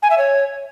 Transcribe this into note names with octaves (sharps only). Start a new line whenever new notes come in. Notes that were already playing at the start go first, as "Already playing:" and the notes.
G#5
E5
C#5